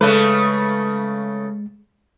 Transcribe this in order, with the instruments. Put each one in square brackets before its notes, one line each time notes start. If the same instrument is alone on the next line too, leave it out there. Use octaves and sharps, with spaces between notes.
[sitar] C#3 A3 B4 [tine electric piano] G#3